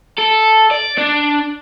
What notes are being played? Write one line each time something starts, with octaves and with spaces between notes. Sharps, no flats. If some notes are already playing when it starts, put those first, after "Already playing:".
A4
D5
D4